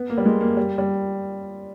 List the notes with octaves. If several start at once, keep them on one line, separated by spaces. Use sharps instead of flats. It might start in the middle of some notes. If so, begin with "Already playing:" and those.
Already playing: B3
A#3
G3
G#3
A#3
G3
G3